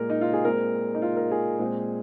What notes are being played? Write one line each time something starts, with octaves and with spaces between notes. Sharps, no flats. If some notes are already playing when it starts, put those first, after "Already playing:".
Already playing: A#2 G#3 A#4
D#4
F4
G#4
A#2 G#3 C4 A#4
D#4
F4
A#4
G#4
A#2 G#3 C4